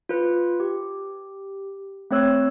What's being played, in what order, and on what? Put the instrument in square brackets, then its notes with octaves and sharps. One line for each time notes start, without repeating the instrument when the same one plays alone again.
[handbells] F4 B4
G4
A3 C4 C#5 E6 F#6